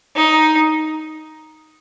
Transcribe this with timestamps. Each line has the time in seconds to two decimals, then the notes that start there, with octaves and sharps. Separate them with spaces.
0.16 D#4